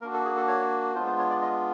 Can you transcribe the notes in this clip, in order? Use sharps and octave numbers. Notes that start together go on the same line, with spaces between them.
A#3 D4 F#4 A#4
A4
G#4
A4
C#5
G#3 B3 D4 F4 C5
C5
C#5
D5
D#5